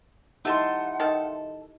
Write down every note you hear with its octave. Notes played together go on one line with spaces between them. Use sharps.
A3 D#4 E4 G4 F#5 A5 C6
D#3 A4